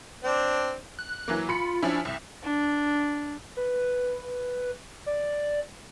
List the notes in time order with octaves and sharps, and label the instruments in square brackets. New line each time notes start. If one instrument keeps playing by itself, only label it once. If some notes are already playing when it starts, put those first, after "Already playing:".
[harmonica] C4 D4
[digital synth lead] F#6
[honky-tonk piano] E3 F#3 A#3
[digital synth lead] F4 [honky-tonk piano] B5 C#7
[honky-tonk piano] F3 C#4 E4 [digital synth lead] D4
[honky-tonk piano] C2 [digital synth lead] E5
[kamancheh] D4
[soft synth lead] B4
D5